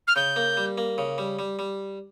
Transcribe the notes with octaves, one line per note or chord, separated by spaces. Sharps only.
F6
C#3 G6
A#3
G3
A#3
C#3
G3
G3
G3